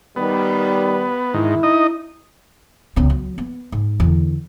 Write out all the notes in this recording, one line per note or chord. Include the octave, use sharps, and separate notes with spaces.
D#3 G3 B3
G#2 D#3 E4
D#4 D#5
C#2 B3
F#3
B3
G#2
E2 D3